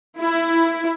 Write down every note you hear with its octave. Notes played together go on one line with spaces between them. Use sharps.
E4